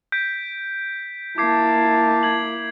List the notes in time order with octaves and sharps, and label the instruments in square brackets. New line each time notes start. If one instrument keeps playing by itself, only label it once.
[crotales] G6 B6 D7
[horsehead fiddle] A#3 E4 [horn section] A5 [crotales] D6 G#6 C7
[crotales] G#6 F#7